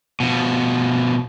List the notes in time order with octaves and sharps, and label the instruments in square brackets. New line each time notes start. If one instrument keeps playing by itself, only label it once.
[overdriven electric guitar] B2 F3